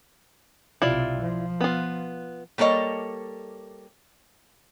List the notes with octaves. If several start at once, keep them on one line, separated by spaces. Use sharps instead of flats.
B1 C3 E4 F4 D5
F3
B3 F4
G3 A#3 A4 C#5 D#5